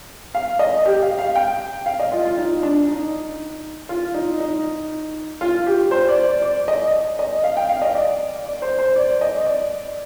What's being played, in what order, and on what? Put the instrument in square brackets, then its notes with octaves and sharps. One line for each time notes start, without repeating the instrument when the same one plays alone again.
[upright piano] F5
D#5
G4
F5
F5
G5
F5
D#5
F4
F4
D#4
D4
D#4
F4
D#4
D#4
F4
G4
C5
D5
D5
D5
D#5
D#5
F5
G5
F5
D#5
D5
D5
C5
C5
D5
D#5
D5